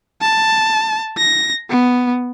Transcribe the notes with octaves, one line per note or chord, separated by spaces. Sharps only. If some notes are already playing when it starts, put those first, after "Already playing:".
A5
A#6
B3